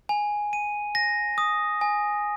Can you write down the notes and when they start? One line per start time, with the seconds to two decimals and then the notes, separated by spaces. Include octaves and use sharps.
0.09 G#5
0.53 D#7
0.95 A#6
1.38 D#6
1.81 G#5